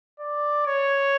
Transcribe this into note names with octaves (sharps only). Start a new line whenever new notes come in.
D5
C#5